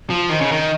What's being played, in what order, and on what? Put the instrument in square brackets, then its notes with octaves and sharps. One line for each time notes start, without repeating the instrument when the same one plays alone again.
[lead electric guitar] F3
[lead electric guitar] D#3 [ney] D#5
[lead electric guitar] C#3
D#3